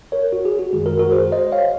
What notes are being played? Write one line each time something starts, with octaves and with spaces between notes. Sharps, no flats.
A#4 C#5
F#4
G#4
F#4
F#2 D#3 G#3 G#4
F#4 A#4
F#4 A#4
G#4 C5
C5 D#5
C#5 F5